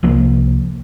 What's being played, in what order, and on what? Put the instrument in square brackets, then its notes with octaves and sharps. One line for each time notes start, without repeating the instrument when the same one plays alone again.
[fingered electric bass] C2 F3 A#3